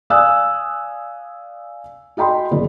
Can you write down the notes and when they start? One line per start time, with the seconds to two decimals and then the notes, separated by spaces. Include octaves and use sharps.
0.10 D5 F5 G#5 D#6 E6 F#6
2.17 F#4 D#5 G5 B5 C6
2.51 F#1 D5